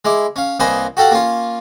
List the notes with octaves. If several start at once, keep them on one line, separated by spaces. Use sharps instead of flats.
G#3 E4 D6
C#4 F5
C2 A#3 B4 C5 D#5 G#5
F#4 G4 A4 F5 F#5
A#3 C#4 F4